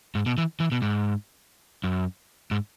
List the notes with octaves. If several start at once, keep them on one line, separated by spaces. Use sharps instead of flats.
G#2
B2
E3
E3
B2
G#2
F#2
G#2